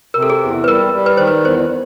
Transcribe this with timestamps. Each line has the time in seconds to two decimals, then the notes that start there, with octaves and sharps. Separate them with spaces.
0.14 C3 A#4
0.22 A4
0.30 G#4
0.43 E2
0.64 B4
0.68 G3 A#4
0.94 G3
1.06 B4
1.17 D#3 C5
1.27 B4
1.44 E2 C5